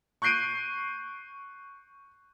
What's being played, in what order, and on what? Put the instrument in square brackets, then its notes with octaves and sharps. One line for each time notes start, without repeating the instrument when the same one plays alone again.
[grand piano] C#6 F#6 G6 C7 D7 D#7